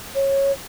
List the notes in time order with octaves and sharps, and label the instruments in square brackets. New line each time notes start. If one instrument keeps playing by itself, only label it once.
[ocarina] C#5